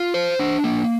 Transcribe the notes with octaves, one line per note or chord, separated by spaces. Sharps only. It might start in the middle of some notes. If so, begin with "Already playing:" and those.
Already playing: F4
C5
D4
A#3